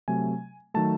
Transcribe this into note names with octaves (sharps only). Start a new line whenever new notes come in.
C3 F#3 A3 G#5
D#3 F#3 A3 A5